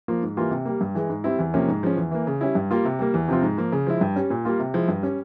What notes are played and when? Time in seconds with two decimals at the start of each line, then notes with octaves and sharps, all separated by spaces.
0.08 F3 A#3 F4
0.22 G#2
0.37 E3 G3 A#3 F4
0.51 C3
0.65 G3 A#3
0.81 G2
0.95 E3 G#3
1.10 G#2
1.24 G3 C4 E4
1.39 E2
1.54 C3 F3 A#3 C#4
1.68 G#2
1.83 F3 G#3 C#4
1.97 E2
2.11 E3 A#3
2.27 C#3
2.41 G3 C#4 E4
2.55 G2
2.71 G3 A#3 F4
2.85 C3
2.99 G3 A#3
3.14 E2
3.28 C3 F3 C4 F4
3.42 G#2
3.58 F3 A#3
3.72 C#3
3.87 F3 G#3 E4
4.01 G2
4.16 G3 C#4
4.30 A#2
4.45 G3 A#3 F4
4.59 C3
4.74 F3 G#3 E4
4.89 G2
5.03 G3 C#4